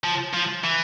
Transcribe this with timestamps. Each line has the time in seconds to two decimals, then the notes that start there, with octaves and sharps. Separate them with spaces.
0.04 F3
0.33 F3
0.64 E3